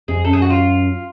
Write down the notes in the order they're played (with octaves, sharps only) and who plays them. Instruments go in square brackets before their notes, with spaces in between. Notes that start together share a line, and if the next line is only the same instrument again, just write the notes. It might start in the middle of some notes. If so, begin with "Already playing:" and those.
[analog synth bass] F2 [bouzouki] G#4
[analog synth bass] F#2 [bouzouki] A4
[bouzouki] G#4
F#4
F4